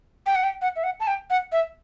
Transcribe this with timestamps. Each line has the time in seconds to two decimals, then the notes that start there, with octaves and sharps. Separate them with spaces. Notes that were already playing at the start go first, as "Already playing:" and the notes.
0.26 G5
0.35 F#5
0.44 G5
0.62 F#5
0.76 E5
0.84 F#5
1.00 A5
1.07 G5
1.30 F#5
1.52 E5